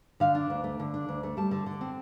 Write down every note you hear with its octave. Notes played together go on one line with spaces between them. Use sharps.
D3 F5
D4
D2
A3
D3
D4
D2
A3
G3 A5
D3
D3
C4